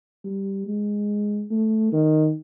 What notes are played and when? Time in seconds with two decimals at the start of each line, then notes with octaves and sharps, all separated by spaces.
0.24 G3
0.67 G#3
1.51 A3
1.92 D#3